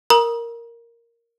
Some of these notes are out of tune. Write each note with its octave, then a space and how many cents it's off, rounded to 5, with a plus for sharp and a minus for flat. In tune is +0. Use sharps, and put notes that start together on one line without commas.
A#4 +0 A#5 +40 D#6 +0